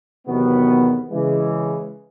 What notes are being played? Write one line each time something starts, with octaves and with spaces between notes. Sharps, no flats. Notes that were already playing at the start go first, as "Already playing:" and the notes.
E2 C3 D#3 F#3 B3
C#3 E3 G#3